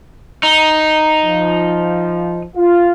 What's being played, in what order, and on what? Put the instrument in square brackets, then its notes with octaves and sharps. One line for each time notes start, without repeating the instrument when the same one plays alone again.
[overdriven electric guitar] D#4
[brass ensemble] F3
F4